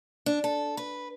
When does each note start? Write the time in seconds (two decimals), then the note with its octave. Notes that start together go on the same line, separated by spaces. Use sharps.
0.26 D4
0.44 A4
0.77 B4